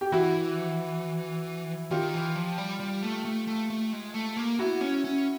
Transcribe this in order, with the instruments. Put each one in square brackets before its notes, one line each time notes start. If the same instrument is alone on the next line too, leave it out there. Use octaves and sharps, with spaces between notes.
[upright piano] G4
[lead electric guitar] E3 [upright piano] E4 F#4
[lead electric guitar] D#3 [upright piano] F4 G4
[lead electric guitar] E3
F3
G3
G3
A3
A3
A3
A3
G#3
A3
A#3
[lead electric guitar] B3 [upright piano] E4 F#4
[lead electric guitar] C#4
C#4